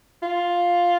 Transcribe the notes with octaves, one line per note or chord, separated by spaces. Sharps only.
F4